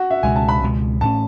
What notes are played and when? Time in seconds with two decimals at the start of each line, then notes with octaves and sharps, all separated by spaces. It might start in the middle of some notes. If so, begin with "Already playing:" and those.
Already playing: F#4
0.11 E5
0.23 C#2 B2 G#3 G#5
0.36 A5
0.49 B5
0.62 C#2 B2 G#3
1.01 A2 F#3 C#4 A5